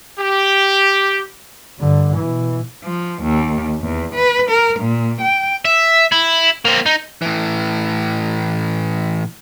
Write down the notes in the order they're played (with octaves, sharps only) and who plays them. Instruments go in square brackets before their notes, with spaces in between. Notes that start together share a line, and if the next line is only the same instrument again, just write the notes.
[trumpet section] G4
[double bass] G2 D3
B2 E3
[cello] F3
D#2
E2
B4
A#4
A#2
G5
[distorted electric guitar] E5
E4
A#3 C4
D#4
[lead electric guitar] A2 E3